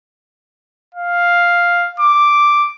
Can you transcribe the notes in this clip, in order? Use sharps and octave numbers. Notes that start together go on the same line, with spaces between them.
F5
D6